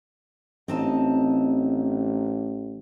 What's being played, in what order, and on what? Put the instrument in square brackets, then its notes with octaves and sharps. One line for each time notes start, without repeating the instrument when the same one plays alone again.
[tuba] A1 [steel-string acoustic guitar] C4 D#4 A5